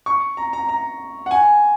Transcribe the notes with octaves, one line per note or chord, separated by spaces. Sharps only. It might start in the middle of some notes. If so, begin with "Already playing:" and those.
C#6
A#5
A#5
A#5
F#5
G#5